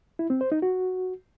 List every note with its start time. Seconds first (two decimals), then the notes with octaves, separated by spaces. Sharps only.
0.19 E4
0.30 C4
0.41 C5
0.52 D#4
0.62 F#4